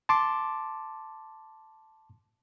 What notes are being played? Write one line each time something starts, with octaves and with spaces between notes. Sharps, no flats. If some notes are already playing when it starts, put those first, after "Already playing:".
A5 C6 D6